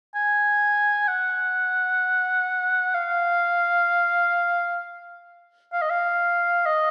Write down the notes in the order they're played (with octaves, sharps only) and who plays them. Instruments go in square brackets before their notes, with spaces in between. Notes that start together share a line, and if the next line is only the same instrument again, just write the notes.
[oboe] G#5
F#5
F5
F5
D#5
F5
D#5